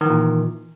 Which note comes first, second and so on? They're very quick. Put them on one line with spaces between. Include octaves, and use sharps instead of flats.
D#3 E3 A#2